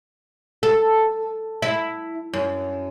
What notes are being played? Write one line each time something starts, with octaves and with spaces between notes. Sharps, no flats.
A4
E4
F#2